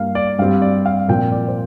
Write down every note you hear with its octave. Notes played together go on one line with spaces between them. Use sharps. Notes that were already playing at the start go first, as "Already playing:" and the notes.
Already playing: G2 G3 A#3 F5
D5
G2 G3 C4 F5
D5
F5
A#2 F3 C4 G5
D5
C5